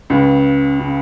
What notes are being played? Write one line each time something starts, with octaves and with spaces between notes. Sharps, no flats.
C#2 C#3
C#3